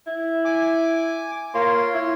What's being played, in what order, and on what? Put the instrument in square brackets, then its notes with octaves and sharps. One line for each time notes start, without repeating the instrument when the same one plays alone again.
[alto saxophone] E4
[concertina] G#5 D6
[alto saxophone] A#3 [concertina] F4 C#5 C6
[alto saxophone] E4